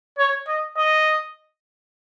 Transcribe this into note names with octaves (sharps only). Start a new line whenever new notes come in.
C#5
D#5
D#5